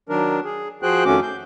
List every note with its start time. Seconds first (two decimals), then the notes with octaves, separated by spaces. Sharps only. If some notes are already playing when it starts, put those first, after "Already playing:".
0.09 D#3 F#3 D4 A#4
0.45 G#4
0.83 F3 F#4 G#4 C5 G5 F#6
1.05 F2 D#3 A3 C#4 F#4 D6
1.22 G6